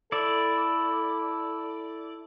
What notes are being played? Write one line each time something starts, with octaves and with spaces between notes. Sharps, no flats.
E4 A4 D5